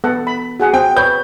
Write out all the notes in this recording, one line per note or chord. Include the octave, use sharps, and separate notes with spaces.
B3 A4 F#5
B5
F#4 G#4 F#5
C4 G5
B4 C#5 G6